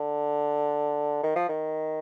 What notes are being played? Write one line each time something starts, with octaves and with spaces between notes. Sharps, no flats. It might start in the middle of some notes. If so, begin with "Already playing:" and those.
Already playing: D3
D#3
F3
D#3